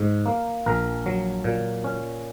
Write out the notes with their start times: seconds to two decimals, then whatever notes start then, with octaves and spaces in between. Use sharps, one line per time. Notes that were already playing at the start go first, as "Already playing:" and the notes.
Already playing: G#2
0.26 A#3
0.66 A#1 A#4
1.06 F#3
1.44 A#2
1.84 C#4